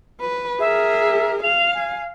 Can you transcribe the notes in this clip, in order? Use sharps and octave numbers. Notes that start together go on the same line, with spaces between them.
B4
G#4 A#4 E5
F5 F7
G#5